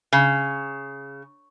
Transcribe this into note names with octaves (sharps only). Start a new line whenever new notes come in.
C#3